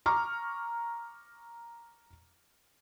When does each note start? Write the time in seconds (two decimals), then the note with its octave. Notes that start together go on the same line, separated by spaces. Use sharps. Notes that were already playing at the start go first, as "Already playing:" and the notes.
0.06 A#5 C#6 D6 F6